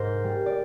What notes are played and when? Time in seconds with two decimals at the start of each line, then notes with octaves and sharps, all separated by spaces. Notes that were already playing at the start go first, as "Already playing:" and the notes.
Already playing: G#2 A#4 C5
0.24 G3
0.46 D5